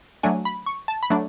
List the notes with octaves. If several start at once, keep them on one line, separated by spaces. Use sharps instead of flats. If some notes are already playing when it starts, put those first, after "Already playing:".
F#3 A3 D4 G#5
B5
C#6
A5
B5
F#3 A3 D4